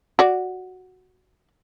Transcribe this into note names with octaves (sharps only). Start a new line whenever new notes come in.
F#4 D5